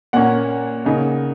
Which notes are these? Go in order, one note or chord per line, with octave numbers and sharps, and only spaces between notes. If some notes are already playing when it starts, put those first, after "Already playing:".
A#2 A#3 C#4 F#5
C#3 A#3 D#4